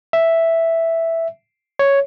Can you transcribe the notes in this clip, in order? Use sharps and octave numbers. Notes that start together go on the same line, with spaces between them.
E5
C#5